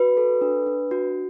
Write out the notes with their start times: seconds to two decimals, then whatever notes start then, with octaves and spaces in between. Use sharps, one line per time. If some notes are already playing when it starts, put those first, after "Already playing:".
Already playing: F#4 B4
0.17 A4
0.41 D4
0.66 D4
0.91 F#4